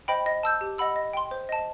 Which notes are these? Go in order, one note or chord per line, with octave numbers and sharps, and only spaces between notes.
C5 D#5 G5 B5
D#5
A5 E6 G6
G4
D#5 F#5 B5 E6
D#5
G5 C6
C5
D#5 A5